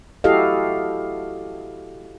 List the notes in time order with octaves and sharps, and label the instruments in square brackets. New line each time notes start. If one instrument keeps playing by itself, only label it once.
[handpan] E4 F#4 G4 A4 D#5 F5